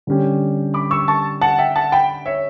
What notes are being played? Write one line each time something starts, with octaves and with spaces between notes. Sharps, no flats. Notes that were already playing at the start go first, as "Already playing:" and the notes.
D3 G3 C#4 G4
B5 D6
C#6 E6
A5 C#6
F#5 A5
E5 G5
F#5 A5
G5 B5
C#5 E5